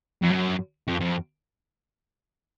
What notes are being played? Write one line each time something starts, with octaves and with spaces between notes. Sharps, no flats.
F2
F#2
F2
F2